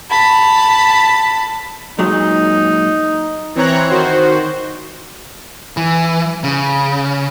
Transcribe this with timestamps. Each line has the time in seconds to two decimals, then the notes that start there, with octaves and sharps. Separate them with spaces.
0.10 A5 B5
1.99 A#2 F#3 G#3 D#4
3.55 E3 C4 C#5 A#5 F#6
3.90 D#3 F#4 C5
5.77 E3
6.44 C#3